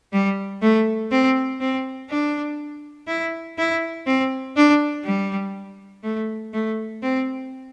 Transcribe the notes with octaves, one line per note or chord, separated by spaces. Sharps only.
G3
A3
C4
C4
D4
E4
E4
C4
D4
G3
A3
A3
C4